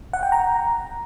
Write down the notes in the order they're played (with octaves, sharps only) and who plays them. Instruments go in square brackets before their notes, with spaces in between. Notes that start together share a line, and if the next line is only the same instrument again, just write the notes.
[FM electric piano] F#5
G5
A#5